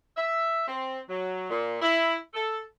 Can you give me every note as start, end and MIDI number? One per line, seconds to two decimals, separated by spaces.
0.17 0.66 76
0.68 0.98 60
1.09 1.46 54
1.50 1.77 46
1.82 2.15 64
2.34 2.59 69